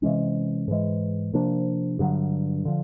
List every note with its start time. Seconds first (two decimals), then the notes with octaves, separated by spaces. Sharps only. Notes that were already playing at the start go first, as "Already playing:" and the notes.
0.02 C3 E3 G#3 C#4
0.68 G#2 E3 G#3
1.33 C3 F3 A#3 D4
1.99 G2 D3 F#3
2.65 D3 F3